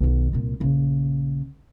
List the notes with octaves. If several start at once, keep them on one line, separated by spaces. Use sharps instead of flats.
B1 D#3
C2 A#2
A#1 C#3